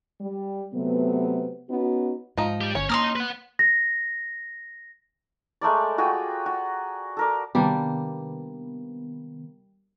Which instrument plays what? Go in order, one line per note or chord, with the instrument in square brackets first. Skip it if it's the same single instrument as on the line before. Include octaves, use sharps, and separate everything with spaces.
[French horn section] G3
C3 F#3 A3 B3
B3 C#4 D#4 F#4
[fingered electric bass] G#2 [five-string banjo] F3 D#4
[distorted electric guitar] G3 G4
[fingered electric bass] G1 [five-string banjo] C#4 [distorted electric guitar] C#5
[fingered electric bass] A#3 [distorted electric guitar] D#5 A#5 [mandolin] C6 D#6 F6
[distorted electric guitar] B4 F#5
[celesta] A#6
[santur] G#3 A3 A#4 D5
F4 F#4 G#4 G5
F#4
A4 A#4 D5
[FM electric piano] C3 D#3 B3 [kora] G3 A#3 D4